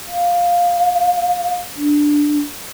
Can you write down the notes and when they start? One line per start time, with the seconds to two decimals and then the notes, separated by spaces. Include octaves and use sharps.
0.07 F5
1.76 D4